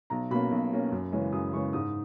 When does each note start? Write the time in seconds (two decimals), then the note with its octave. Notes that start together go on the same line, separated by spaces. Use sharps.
0.10 B1 A#5
0.30 B2 A#3 C#4 B5
0.51 B1
0.72 B2 A#3 C#4
0.92 F#2
1.12 C#3 E3 G#3 C#4
1.32 F#2 D#6
1.53 C#3 E3 G#3 C#4 C#6
1.73 G#2 D#6